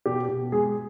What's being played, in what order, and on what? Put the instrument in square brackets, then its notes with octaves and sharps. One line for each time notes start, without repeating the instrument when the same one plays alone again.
[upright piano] B2 G4
B2
G#3 G#4